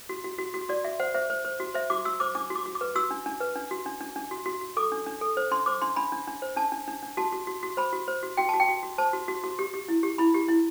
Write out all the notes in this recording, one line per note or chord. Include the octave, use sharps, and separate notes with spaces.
F#4
F#4
F#4
F#4
F#4 D5
F#4 E5
C5 F#5
C5 E5
C5
C5
F#4
C5 E5
F#4 D6
F#4 E6
C5 D6
D4 D6
F#4 D6
F#4
D6
B4
F#4 E6
D4
D4
B4
D4
F#4
D4
D4
D4
F#4
F#4
F#4
A4 D6
D4
D4
A4
C5
D4 C6
C5 D6
D4 C6
D4 B5
D4
D4
C5
D4 A5
D4
D4
D4
F#4 A5
F#4
F#4
F#4
C5 B5
F#4
C5
F#4
F#4 G5
F#4 A5
G5
F#4
F#4
C5 A5
F#4
F#4
F#4
G4
G4
E4
G4
E4 B5
G4
E4